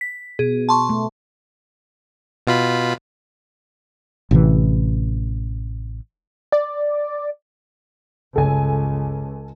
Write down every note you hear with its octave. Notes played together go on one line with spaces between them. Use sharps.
B6
B2 G#4
A5 C6 C#6
A3
B2 F4 B5
A1 C3 D#3 E3
D5
G1 C#2 C#3 A4 G#5